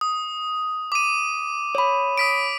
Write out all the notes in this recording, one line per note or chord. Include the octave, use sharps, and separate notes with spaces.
D#6
D6 D#7
C#5 B5
D#6 B6 D7